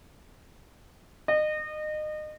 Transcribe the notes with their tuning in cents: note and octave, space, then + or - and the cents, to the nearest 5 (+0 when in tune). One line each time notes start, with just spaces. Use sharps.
D#5 -30